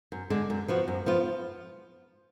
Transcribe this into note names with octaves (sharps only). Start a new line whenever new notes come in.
F#2
D3 G#3 D4
F#2
F3 B3 F#4
F#2
F3 B3 F4